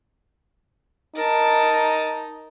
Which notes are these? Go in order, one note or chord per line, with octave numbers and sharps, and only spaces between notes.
D#4 A#4 A5